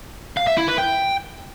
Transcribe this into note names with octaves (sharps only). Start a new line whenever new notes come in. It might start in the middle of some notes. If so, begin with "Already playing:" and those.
F5
E5
E4
B4
G5